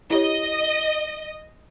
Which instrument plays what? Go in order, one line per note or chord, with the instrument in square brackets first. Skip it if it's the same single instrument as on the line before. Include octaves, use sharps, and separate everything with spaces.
[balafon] E4 G4 C#5 [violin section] D#5